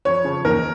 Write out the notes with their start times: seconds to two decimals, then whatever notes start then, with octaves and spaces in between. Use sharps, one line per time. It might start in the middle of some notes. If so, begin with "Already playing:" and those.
0.05 F2 C#5
0.24 C#3 F3
0.45 D#2 A#4